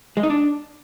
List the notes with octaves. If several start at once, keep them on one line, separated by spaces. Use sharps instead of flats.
G#3
D#4
D4